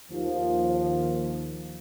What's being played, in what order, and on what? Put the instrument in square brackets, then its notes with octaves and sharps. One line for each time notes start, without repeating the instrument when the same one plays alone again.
[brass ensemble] D#2 F3